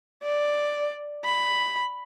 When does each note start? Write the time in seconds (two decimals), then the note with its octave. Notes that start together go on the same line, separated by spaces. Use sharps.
0.23 D5
1.25 B5